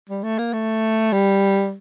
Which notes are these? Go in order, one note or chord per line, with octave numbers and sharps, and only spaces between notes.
G3
A3
A#3
A3
G3